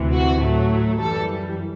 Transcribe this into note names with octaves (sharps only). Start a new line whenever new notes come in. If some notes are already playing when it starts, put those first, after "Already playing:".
Already playing: D2 C3 E3
F#4
A2 F#3 A3
F#2 E3 G3 A4